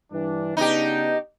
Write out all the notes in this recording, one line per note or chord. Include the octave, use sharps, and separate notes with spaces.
G2 E3 D4
C#3 B3 D4 D#4 G4